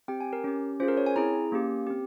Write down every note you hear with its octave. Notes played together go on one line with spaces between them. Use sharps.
C4 G4 G5
G#5
A#4
C#4 G4
C#4 F4 G#4 C5
A#4
C#5
G#5
C4 E4 G#4 A#5
A#3 C#4 G4
C4 G4